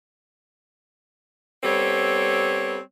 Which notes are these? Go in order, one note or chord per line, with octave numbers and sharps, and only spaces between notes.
G3 B3 C4 A4 C#5